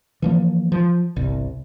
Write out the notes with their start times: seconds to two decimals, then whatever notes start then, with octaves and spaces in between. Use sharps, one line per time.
0.22 E3 F3 A#3
0.72 F3
1.16 G1 C2